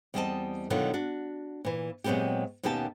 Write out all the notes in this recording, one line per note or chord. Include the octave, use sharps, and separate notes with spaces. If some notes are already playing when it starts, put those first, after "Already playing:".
E2 G3 C4 D#4 D#5 A5
B2 D3 D#3 F#3 F4
D4 F#4
A#2 E3
A#2 F#3 G#3 B3 C4 G4
D#2 B2 A#3 C#4 G4 A5